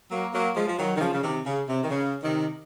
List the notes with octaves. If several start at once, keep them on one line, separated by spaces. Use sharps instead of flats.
F#3 A#3
F#3 A#3
F3 G#3
F3
D#3 F#3
D#3
C#3 F3
C#3
C3 D#3
C#3
C3
D#3
C#3
C3 D#3